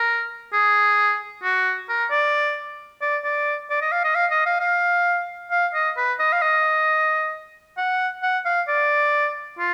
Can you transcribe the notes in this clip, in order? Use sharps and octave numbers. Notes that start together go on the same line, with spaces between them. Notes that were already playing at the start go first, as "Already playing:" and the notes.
Already playing: A#4
G#4
F#4
A#4
D5
D5
D5
D5
D#5
F5
D#5
F5
D#5
F5
F5
F5
D#5
B4
D#5
F5
D#5
F#5
F#5
F5
D5
F4